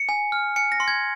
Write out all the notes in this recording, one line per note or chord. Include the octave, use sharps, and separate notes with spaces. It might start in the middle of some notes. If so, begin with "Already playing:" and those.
Already playing: C#7
G#5
F6
G#5 C#7
A#6
C6
G#6